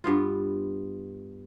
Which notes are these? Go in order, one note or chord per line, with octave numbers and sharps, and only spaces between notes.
G2 B3 F4